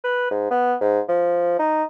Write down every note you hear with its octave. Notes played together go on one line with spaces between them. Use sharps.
B4
G#2
B3
G#2
F3
D#4